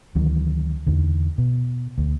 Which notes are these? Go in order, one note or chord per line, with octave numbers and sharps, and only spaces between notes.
D2 D#3 E3 F#3
E2 D3
B2
D2